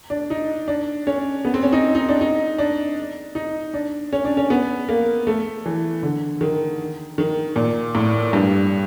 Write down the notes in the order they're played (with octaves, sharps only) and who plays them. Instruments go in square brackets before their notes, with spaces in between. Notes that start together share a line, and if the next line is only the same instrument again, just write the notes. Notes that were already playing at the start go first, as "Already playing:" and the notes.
[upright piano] D4
D#4
D4
C#4
B3
C4
C#4
D#4
D#4
D4
D#4
D4
D#4
D4
C#4
D4
C#4
B3
A#3
A3
E3
D3
D#3
D#3
A#2
A2
G2